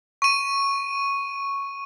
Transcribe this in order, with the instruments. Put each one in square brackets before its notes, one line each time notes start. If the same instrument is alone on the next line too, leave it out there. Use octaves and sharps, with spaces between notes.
[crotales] C#6 D#7